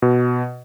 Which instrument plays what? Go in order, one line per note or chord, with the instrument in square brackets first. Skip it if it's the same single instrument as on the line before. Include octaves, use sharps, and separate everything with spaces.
[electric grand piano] B2